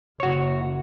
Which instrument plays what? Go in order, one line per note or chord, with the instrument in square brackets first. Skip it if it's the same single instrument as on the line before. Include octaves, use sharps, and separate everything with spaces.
[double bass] F#1 [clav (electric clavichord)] F#4 C#5